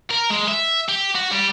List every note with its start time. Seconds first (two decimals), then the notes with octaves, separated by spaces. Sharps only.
0.11 A#4
0.30 G#3
0.48 E5
0.89 G4
1.15 F#4
1.32 G3